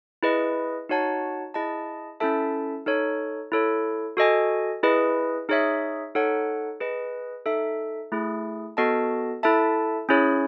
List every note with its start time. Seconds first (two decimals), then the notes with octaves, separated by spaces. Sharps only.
0.23 E4 G#4 B4 D#5
0.89 D#4 F#4 C#5 F#5 A5
1.54 E4 G#4 D#5 A5
2.20 C#4 E4 A4 E5 A5
2.86 D#4 A4 C#5
3.52 E4 A4 C#5
4.17 F#4 A4 D#5 G#5
4.83 E4 G#4 B4 D#5
5.49 D#4 G#4 C#5 E5
6.15 D#4 A4 C#5 F#5
6.80 G#4 B4 D#5
7.46 D#4 A4 E5
8.12 A3 E4 G#4
8.77 B3 F#4 A4 D#5 A5
9.43 E4 A4 E5 A5
10.09 C#4 E4 G#4 C#5